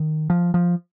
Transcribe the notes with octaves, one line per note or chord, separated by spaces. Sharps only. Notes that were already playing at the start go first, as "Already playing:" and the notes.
Already playing: D#3
F3
F3